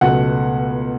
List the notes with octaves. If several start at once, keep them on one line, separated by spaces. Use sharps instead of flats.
C#2 B2 F#3 A3 F#5